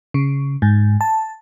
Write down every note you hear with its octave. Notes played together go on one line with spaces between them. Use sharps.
C#3
G#2
A5